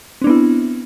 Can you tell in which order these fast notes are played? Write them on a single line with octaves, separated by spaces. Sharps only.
C4 D4 B3 E4